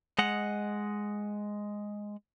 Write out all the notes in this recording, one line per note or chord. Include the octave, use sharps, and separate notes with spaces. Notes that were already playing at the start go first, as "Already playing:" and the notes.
G#3 D#5 F#5